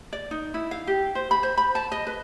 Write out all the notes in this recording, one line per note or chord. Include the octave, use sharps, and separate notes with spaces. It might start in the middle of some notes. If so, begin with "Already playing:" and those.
D5
D#4
E4
F5
G4
C5
B5
C5
B5
A5
D#5
B4